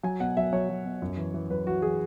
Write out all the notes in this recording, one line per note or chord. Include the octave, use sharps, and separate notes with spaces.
F#3 G#5
B2 F#5
F#3 E5
F#3 C#5
F#3
B2
F#2
E3
E3
F#2 B4
E3 F#4
E3 G#4